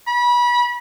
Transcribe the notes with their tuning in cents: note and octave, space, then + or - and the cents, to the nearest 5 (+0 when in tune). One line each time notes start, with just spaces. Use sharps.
B5 -30